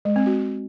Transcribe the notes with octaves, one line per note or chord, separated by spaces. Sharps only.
G#3
C4
F#4